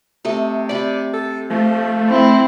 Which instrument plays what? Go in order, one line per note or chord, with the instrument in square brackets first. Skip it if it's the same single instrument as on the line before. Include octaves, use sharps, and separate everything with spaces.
[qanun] C3 A3 D#5
[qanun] C3 B5 [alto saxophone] D5
[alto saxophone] A4
[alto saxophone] F3 [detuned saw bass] A3
[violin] C4 E4